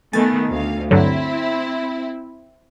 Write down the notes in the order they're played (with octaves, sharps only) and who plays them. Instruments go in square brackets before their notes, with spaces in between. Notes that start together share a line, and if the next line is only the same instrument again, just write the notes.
[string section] D#3 A3 B3 [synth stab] G#5 A6
[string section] D2 F5
[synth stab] G2 D3 F#3 [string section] C4 E4